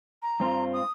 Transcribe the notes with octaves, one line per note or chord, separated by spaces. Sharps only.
A#5
G2 C4 F4
D#6